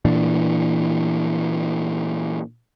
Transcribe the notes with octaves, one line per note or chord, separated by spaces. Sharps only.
A#2 E3 D4